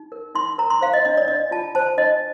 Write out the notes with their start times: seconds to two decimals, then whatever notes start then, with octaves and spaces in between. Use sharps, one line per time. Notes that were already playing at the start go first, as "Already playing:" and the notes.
Already playing: D#4
0.12 A#4
0.35 D#4 C6
0.58 A#4 A#5
0.70 C6
0.81 C5 F5
0.94 D#5
1.05 D4 D#5
1.17 D5
1.28 D4 D#5
1.51 F4 A5
1.75 C5 A5
1.98 D4 D#5